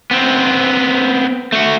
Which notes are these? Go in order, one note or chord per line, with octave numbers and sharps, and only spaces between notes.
B3 C4
A3 F#4